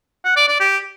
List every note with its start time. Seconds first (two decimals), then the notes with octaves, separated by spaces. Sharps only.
0.25 F#5
0.36 D5
0.48 D5
0.60 G4